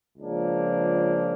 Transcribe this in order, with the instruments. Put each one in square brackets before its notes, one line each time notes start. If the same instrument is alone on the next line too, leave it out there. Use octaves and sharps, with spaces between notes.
[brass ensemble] C#2 C#3 F3 A#3 D4